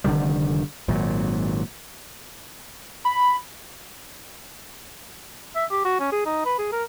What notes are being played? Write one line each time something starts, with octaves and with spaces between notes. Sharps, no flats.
F1 D3 D#3 G3
G#1 A#2 F#3
B5
E5
G4
F#4
C#4
G#4
D#4
B4
G#4
A#4